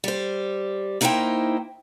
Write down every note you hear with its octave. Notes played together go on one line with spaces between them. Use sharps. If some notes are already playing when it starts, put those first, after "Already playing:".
G3 C5
A#3 D#4 E4 A#4 C5 G5